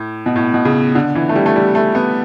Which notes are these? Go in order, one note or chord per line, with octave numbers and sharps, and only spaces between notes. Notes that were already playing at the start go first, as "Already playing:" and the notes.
Already playing: A2
B2
A2
B2
C#3
D3
E3
A3
G3
A3
G3
A3
B3